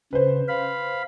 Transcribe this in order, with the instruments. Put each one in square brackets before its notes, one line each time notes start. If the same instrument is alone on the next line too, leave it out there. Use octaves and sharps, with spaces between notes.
[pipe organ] C#3 [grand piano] B4 C5
[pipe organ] F5 B5